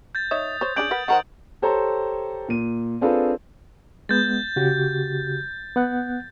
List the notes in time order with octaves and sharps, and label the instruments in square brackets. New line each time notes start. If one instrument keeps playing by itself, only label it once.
[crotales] G6 A6
[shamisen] D#4 C#5 E5 [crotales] D#6
[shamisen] C5 C#5
[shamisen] C#4 D4 G#4 [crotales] G6 D7 F#7
[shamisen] A#4 B4 F#5
[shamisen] D#3 A#4 C5 [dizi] F#5
[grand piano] G4 A4 C5 C#5 A#5
A#2 D#7
C4 D4 F4 G#4 A4 B4
[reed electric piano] G#3 B3 [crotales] G6 A6
[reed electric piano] C#3 F#4 G4
B3 F#5 F#6